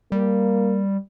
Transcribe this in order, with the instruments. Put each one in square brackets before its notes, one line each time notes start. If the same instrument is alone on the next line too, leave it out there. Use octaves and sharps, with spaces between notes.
[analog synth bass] G3 [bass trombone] A#3